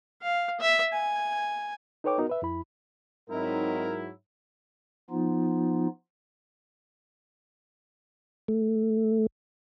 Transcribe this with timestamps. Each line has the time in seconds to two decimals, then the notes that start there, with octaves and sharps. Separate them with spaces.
0.22 F5
0.60 E5
0.93 G#5
2.04 D#4 A4 B4 C#5 G5 D6
2.18 B3 D#4 F#4 A#4
2.29 B4 E5
2.42 F2 E4 B5
3.30 G#2 F#3 C4 D#4 E4 A#4
5.10 F3 B3 D#4 F4
8.48 A3